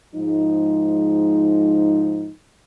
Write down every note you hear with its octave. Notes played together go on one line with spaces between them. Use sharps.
G#2 F3 G#3 D#4